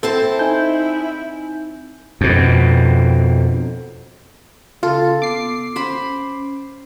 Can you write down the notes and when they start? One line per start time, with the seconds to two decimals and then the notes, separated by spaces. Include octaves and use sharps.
0.03 C4 E4 A4 C5 A5
0.39 D#4 G#5 G6
2.21 F2 B2
4.83 C#3 F4 A4
5.22 B3 D6 C7
5.76 C#4 C5 B5